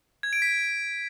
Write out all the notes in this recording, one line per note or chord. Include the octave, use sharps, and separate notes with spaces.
G#6
D7
B6